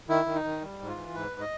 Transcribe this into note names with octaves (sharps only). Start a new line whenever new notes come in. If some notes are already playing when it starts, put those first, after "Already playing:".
D#3 E4
D#3
D#4
D#3
G3
G#2
F4
E3
G#2 B4
G#2
D#5